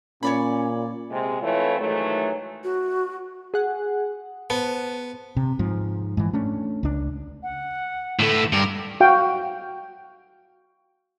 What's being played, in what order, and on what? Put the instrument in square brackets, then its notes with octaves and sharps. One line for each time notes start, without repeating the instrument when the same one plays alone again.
[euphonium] A#2 [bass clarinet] C#4 [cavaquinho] C#5 D5 B5
[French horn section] C3 G#3
E3 A3 C4 E4 F4 C#5
G#2 D#3 E3 F#3 A3
[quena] F#4
[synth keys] G#4 F#5
[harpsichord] B3 [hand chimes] C5 A5
[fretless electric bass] C3
G#2 F3
G#2 E3
A3 C#4 D4
C#2 D4
[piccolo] F#5
[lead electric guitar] A2 A3 [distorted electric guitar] D3 B4
[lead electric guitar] G2 [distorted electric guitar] A#4
[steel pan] F#4 F5 G5